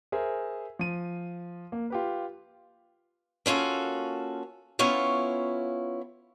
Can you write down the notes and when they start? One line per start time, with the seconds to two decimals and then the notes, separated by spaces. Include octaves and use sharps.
0.12 G#4 A#4 C5 E5
0.79 F3 D#7
1.72 A#3
1.90 F4 G4 B4
3.46 A#3 C#4 F4 F#4 A4
4.79 B3 C#4 E4 F4 C#5 F5